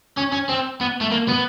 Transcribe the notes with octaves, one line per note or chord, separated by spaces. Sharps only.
C#4
C#4
C4
B3
A3
A#3
B3